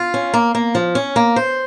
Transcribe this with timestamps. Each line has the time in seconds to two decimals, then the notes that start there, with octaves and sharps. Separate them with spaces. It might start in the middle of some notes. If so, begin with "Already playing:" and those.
Already playing: F4
0.14 C#4
0.34 A#3
0.55 A#3
0.75 F3
0.95 C#4
1.16 A#3
1.36 C5